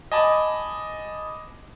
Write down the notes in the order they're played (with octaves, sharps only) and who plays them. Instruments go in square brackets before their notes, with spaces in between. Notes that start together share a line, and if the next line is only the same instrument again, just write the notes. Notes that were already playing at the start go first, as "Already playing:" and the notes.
[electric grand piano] D#5 G#5 A5 B5 D6